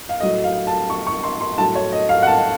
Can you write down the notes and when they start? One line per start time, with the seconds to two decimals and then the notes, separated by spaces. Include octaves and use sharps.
0.09 F5
0.20 A2 F#3 D#5
0.44 F5
0.67 A5
0.90 C#6
1.07 C#6
1.24 C6
1.41 C6
1.58 A2 F#3 A5
1.75 C#5
1.92 D#5
2.09 F5
2.23 F#5
2.27 A5